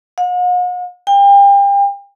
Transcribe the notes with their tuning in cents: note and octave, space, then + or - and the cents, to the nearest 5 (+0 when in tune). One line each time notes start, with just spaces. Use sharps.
F#5 -45
G5 +35